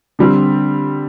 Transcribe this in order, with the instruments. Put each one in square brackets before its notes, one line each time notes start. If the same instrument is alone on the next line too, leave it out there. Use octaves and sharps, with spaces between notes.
[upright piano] D3 G3 C4